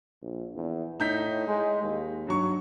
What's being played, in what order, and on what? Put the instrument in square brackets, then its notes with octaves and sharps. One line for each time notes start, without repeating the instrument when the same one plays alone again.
[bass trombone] A#1
E2
[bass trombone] A2 [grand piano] D#4 G6 B6
[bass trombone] G#3
D#2
[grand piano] G2 F#3 C#6